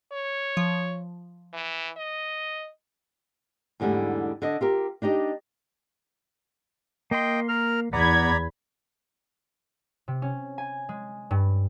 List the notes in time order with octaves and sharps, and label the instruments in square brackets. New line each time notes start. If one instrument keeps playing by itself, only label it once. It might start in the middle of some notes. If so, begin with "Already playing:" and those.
[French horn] C#5
[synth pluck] F3
[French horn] E3
D#5
[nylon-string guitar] E2 G#2 D3 G3 A3 E4
D3 D4 D#5
F4 G4 A#4
D4 D#4 G4 D#5
[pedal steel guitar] A#3 C6 [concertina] D#5 G5
[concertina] A#4 F6
[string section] E2 B5 G#6 [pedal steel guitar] B3 [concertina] D5 A#5
[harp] C3
C#4
G#5
G#3
G2